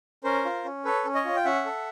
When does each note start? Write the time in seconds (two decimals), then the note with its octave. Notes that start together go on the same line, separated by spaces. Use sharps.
0.24 C#4 A#4 C5
0.45 F4
0.64 C#4
0.85 A4 B4 C#5
1.05 C#4
1.15 C#5 D#5
1.25 F4
1.36 G5
1.45 C#4 E5 F#5
1.66 A4